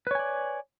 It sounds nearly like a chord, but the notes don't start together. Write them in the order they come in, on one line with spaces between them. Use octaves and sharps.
B4 C#5 G#5 D5